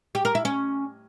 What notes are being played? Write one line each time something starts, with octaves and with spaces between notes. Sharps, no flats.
G4
A#4
E4
C#4